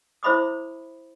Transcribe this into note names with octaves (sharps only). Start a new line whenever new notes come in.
E4 C5 E5 B5 D6 D#6